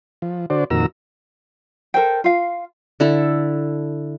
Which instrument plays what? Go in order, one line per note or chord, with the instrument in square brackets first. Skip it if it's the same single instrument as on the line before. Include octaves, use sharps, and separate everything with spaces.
[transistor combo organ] F3
D3 F#4 C5 D5
F2 A#2 D#3 F#4 A#5 E6
[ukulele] A4 A#4 C5 G5
F4 F5
[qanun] D3 E4 A4